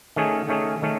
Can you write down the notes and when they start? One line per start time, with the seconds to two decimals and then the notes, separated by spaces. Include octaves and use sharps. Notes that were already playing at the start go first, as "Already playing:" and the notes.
0.16 D#3 A3 C#4 G#4
0.49 D#3 A3 C#4 G#4
0.82 D#3 A3 C#4